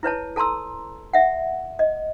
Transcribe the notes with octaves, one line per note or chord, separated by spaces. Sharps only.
E4 B4 C#5 A5
A4 A5 A#5 C6 E6
E5 F#5
D#5